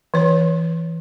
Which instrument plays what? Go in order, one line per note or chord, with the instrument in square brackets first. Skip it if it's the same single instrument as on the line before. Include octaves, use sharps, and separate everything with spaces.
[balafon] E3 C#5